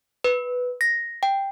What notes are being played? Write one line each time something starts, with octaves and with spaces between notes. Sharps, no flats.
B4
A#6
G5